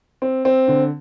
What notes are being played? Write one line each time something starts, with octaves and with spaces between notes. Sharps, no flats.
C4
C4
D3